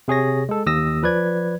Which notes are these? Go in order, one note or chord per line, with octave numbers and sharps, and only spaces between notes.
C3 G#4 C#5 A#6
G#3 A4
D#2 D#6 E6 A#6
F3 B4 D5 G#6